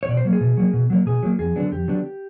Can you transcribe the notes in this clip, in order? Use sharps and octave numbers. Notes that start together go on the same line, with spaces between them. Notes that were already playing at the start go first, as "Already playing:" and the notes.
C#5
B2 D5
C5
F#3 A#3
G#4
B2
F#3 A#3
B2
F#3 A#3
B2 G#4
F#3 A#3
F2 G#4
D3 F#3 B3 D4
F2 G4
D3 F#3 B3 D4